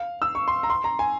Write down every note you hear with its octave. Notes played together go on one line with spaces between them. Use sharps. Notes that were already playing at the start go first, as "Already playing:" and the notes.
Already playing: F5
E6
C#6
C6
A#5
C6
A#5
G#5